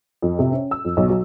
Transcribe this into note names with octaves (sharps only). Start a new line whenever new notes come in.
F2
C3
C#4
E6
F2
B1
F#3